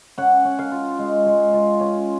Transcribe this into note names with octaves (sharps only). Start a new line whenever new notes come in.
C#4 F#5
C#4
F5
F4
G#3
G#3
F4
C#4